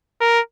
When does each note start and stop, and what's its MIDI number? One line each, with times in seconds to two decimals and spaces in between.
0.21 0.40 70